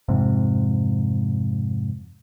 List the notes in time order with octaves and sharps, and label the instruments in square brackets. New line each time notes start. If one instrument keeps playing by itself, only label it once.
[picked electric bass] F2 G#2 C3